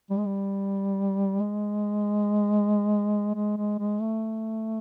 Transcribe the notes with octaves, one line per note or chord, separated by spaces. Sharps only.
G3
G#3
G3
G#3
G#3
G#3
G#3
A3